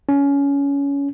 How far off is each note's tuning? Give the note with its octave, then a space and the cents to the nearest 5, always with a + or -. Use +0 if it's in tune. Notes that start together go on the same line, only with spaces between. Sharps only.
C#4 +20